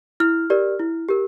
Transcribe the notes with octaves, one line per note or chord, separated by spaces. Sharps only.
E4 F6
G4 A#4 D5
E4
G4 A#4